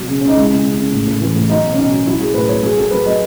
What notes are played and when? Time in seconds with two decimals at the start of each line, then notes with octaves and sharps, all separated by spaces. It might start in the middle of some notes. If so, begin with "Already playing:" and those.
Already playing: B2 F#3
0.08 C#3
0.21 C#3 C#4
0.28 D#4
0.36 G#3 E4
0.50 C#3
0.64 C#3
0.78 C#3
0.92 A2
1.07 A2
1.21 E3
1.35 A2
1.49 F#3 D#4
1.63 B2
1.73 C#4
1.78 B2 D#4
1.91 F#3
2.06 F#3 E4
2.20 F#3 G#4
2.34 A2 B4
2.49 F#3 C#5
2.63 F#3 G#4
2.76 F#3 A4
2.91 F#3 B4
3.05 F#3 D#5